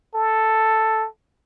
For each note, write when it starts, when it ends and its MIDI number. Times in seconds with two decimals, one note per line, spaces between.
0.14 1.07 69